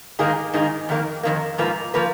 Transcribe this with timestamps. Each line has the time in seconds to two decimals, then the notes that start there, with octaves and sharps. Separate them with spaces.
0.19 G#2 D#3 A#3 D#4 G#4
0.54 G#2 D#3 A#3 D#4 G#4
0.89 F2 D#3 A#3
1.23 F2 D#3 A#3
1.58 G#2 F3 A#3 F4 B4
1.94 F3 A#3 F4 B4